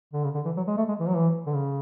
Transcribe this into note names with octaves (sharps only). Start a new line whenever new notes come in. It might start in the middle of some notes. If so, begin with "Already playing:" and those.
D3
C#3
D3
E3
F#3
G#3
A3
G#3
E3
F#3
E3
D3
C#3